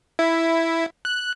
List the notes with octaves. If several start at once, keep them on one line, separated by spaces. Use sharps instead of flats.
E4
F#6